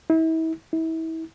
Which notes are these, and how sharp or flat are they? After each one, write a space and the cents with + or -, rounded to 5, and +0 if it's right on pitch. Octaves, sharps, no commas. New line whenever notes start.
E4 -35
E4 -30